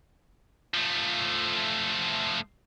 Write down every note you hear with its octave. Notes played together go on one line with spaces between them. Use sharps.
F3 A3